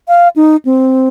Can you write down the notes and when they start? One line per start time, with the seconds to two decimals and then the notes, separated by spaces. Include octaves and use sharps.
0.08 F5
0.36 D#4
0.65 C4